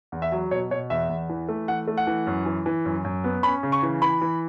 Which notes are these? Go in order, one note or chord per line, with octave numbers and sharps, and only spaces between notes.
E2
E5
F#3
B2 C#5
B2 C#5
E2 E5
E2
E3
A3
E3 F#5
A3
F#5
E3
F#2
E3
E3
F#2
F#2
B3
C#4 B5
C#3
C#6
E3
E3 B5
E3